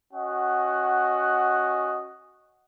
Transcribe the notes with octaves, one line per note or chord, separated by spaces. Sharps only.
C#4 F#4 D#5 F#5